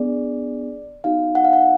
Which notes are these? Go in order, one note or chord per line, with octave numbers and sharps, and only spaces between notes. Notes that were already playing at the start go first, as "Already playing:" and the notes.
Already playing: B3 D4 G#4 D5
B3 D#4 F#4 F5
F#5
F5
F#5